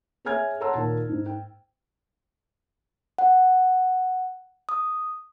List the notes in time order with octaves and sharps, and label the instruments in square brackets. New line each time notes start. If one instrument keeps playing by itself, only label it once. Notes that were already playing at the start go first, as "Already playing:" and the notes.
[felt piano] G#4 C#5 E5 G#5 F6 G#6
C#5 F#5 A5 A#5 C6 E6
D#2 A#2 A5
G#2
G5
[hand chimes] F#5
D#6